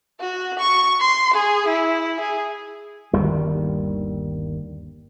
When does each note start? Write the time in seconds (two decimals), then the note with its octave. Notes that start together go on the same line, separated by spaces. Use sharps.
0.21 F#4
0.59 C#6
1.00 C6
1.34 G#4
1.68 E4
2.20 G#4
3.13 G1 D#2 D#3 G3